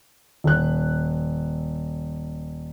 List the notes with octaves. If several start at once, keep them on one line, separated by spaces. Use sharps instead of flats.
D#1 F#6